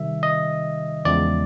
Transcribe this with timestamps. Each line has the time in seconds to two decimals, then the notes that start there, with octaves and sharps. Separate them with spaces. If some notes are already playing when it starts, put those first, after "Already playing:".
Already playing: C3 D#3 G3 E5
0.23 D#5
1.05 E2 C#3 F3 G#3 D5